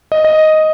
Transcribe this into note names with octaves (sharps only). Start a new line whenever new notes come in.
D#5
D#5